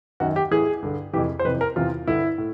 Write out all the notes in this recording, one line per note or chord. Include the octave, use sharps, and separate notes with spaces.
F#2 D#3 F#4
G4
A2 E3 G#4
G2 D3
F2 C3 E3 G4
C5
F2 C3 E3 B4
A#4
E2 C3 E3 F4
G2 D3 E4
A2